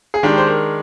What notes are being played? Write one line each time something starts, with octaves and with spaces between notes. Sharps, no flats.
G#4
D#3 G#3 D4 G4
C5
A#4